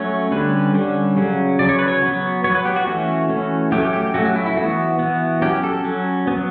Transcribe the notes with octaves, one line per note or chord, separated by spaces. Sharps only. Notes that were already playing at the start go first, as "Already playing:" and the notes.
Already playing: F#3 A3 C#4 C#5
D3 G3 C#4 B4
D3 G3 C#4
C#3 F#3 C#4
C#3 F#3 C#4 D5
C#5
B4
C#5
F#3 B3
F#3 B3 C#5
B4
G4
F#4
E3 A3 C#4 F#4
E3 A3 C#4
F#3 A3 C#4 G4
G4
F#3 A3 C#4 F#4
F#4
E4
E4
E3 B3 F#4
E3 B3
F#3 C#4 G4
A4
F#3 C#4
F#3 B3